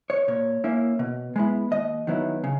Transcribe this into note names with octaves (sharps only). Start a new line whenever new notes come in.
C#5
A#2 C#5
A#3 C#4 E4
B2
G#3 B3 E4
D#2 D#5
D#3 F#3 B3 E4
C#3